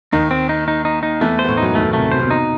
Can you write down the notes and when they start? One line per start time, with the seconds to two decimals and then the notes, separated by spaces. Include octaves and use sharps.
0.12 D#2 D#3 D#4
0.31 C4
0.49 D#4
0.68 D#4
0.85 D#4
1.03 D#4
1.21 E2 E3 A3
1.39 C5
1.44 B3
1.48 A2 A3
1.57 F#2 F#3 D#4
1.75 D#2 D#3 A3
1.93 C2 C3 A3
2.12 B2 C5
2.19 C3
2.26 B2 D#4